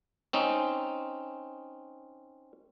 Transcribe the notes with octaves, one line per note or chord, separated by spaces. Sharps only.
C4 C#4 D#4